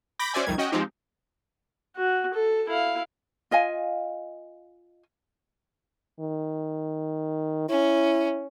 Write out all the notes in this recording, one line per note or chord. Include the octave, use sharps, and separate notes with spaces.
B5 D6 G6 A#6
C#4 F#4 C5 D5 E5 G#5
C2 F2 D#3 G3 G#6
C#4 F#4 D#5 G5
F3 G#3 C4 D#4 G4
F#4
A4
E4 F5
F4 D#5 F5 G#5
D#3
C#4 E4